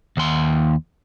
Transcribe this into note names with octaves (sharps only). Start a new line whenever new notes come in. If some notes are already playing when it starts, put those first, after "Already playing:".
D#2 C6